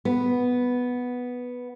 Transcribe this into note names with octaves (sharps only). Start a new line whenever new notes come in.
B3